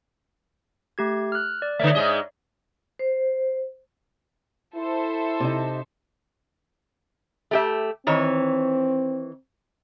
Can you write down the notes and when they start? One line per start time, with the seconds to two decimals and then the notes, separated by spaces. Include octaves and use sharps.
0.98 A3 G4 G#6
1.32 F6 F#6
1.62 D5
1.79 D3 A3 C#5 D5 E5
1.95 G#2 G#3 D#5
2.99 C5
4.75 E4 A4 C5 E5
5.40 C3 D#4
7.51 A3 G4 E5
8.07 D#3 E3 C4 C#5